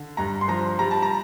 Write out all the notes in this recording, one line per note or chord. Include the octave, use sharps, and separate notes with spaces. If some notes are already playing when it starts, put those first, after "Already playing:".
Already playing: D3
G2 A#5
C6
F3 A#5
G3 A#5
A5
A#5